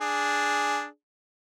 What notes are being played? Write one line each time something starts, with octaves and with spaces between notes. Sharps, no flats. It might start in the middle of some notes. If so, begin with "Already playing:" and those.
D4 G#4